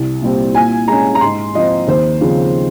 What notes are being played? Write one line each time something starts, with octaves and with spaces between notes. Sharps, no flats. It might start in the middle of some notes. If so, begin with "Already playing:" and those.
Already playing: C2
A#2 G3 C4
A#2 G#5
G#3 C#4 A#5
A#5
G#2 C6
F3 C4 D#5
D#2 C5
C#3 F3 C4